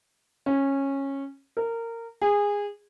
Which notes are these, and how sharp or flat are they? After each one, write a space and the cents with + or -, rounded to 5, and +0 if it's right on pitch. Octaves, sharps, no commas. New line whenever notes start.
C#4 -15
A#4 -20
G#4 -20